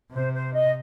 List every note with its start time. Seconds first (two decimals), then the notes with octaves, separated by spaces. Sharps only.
0.12 C3 C5
0.33 C5
0.53 D#5